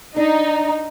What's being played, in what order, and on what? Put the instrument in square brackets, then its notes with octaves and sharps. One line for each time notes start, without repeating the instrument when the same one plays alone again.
[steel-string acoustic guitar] D4 [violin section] D#4